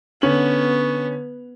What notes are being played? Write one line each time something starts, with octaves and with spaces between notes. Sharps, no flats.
D3 B3 C#4 F#7